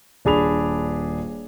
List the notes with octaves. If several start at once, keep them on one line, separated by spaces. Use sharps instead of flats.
D#1 D4 G#4 B5 F7